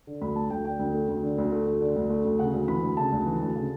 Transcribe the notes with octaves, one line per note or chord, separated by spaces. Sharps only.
D3
D2 B5
A3 A5
D2 G5
D3 G5
D2
A3
D2
D3
D2
A3
D2
D3
D2
A3
D2
C#3 F#5
D2
E3 B5
D2
C#3 A5
D2
E3
D2
C#3